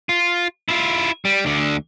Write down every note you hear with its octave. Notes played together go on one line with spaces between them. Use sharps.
F4
E4 F4
G3
D2 D3